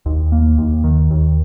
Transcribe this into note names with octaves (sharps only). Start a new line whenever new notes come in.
D#2
A#3
D#2
D#3
D#2